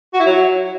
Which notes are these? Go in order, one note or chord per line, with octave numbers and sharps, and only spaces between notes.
F#4
E4
F#3